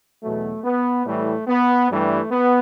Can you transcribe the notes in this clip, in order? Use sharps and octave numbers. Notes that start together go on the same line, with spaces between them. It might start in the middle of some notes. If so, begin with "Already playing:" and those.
E2 B2 F#3 A3
B3
A2 E3 G3 A3
B3
G2 E3 G3 A3
B3